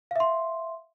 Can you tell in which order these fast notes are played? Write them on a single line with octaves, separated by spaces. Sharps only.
F5 E5 C6